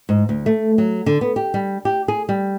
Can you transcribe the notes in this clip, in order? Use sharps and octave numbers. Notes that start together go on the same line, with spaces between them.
G#2
D2
A3
F#3
D3
B3
G4
G3
G4
G#4
G3